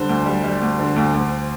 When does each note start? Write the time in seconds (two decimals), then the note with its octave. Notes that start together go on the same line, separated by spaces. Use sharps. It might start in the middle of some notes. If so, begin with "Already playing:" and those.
Already playing: D3 G3 C5
0.09 D2
0.26 G3
0.44 G3
0.61 D2
0.79 D3
0.96 D2
1.14 D2